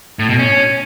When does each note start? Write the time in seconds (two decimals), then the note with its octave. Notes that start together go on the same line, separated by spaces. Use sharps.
0.19 A2
0.29 B2
0.39 C#4